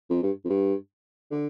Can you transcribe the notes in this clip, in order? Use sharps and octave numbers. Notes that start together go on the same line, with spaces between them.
F2
G2
F2
G2
D3